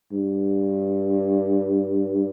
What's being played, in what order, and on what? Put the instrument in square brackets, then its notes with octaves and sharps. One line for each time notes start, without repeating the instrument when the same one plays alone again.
[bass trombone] G2